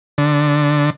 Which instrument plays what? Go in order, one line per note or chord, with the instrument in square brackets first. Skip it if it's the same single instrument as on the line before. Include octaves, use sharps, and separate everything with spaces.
[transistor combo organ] D3